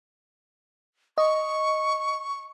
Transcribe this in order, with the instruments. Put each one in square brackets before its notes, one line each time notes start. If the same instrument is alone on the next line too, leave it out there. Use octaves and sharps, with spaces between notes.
[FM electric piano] D#5 [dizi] C#6